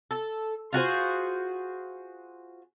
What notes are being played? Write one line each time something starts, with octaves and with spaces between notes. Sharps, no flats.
A4
F4 F#4 G#4 C5